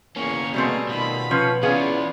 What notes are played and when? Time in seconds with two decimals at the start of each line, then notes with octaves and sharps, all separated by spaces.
0.16 E2 A#3 C#4 G#5 C#6
0.54 B2 G3 A3 C4 G#4 A5
0.89 B2 D#3 F4 B5
1.31 F3 C#4 B4 C#5
1.63 E3 B3 C#4 E4 F4 G#4 D5 F5